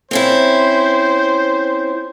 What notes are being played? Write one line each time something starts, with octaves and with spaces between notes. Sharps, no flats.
C4 C#4 E4 C5